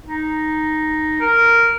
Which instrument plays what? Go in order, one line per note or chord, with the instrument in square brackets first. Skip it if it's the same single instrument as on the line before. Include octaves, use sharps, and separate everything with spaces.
[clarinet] D#4
A#4